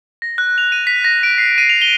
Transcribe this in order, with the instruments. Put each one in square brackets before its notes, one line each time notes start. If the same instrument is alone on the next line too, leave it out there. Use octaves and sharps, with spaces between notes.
[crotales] A#6
F#6
F7
D#7
B6
A#6
D7
C7
D#7
F7
G7